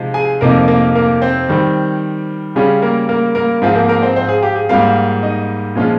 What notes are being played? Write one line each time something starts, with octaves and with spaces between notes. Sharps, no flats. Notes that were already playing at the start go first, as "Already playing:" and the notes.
Already playing: C3 F3 G#3 D#4
G#4 G#5
F2 C3 F3 A#3 D#4 A#4
A#3 A#4
A#3 A#4
C4 C5
D#3 G3 C4
C#3 G3 C#4 F4 G#4
A#3 A#4
A#3 A#4
A#3 A#4
G#2 F3 C4 F4 G#4
A#3 A#4
A#3 A#4
C4 C5
C4 C5
G#4
G4
G#4
G#2 G3 A#3 F4 F5
D#4 D#5
A#2 F3 G#3 C#4 F4